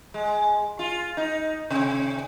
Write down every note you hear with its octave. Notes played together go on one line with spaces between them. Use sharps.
G#3
F4
D#4
C3